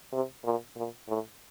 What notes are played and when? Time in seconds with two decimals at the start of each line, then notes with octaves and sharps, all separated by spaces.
0.12 C3
0.45 A#2
0.76 A#2
1.09 A2